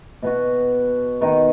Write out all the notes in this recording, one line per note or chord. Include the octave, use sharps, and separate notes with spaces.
B2 B3 F#4
D#3 B3 D#4